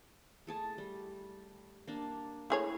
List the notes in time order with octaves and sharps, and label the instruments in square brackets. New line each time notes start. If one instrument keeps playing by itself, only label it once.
[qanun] A3 G#4 A5
G3
A#3 D4
[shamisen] A3 G#4 C#5 [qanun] E4